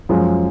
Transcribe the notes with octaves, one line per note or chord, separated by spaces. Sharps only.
F#2 F3 G#3